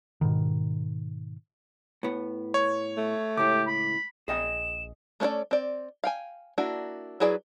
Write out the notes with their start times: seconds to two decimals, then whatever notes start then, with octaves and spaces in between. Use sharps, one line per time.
0.21 G#2 B2 D#3
2.03 A2 B3
2.54 C#5
2.97 A3
3.37 C#2 A2 G4 D6
3.68 B5
4.28 A#1 G#4 D#5 G5 E7
5.20 A3 C#4 D4 A4 D5
5.51 C4 D5
6.04 F5 G5 G#5
6.58 A#3 D4 E4 F#4
7.20 F#3 E4 G#4 B4 D5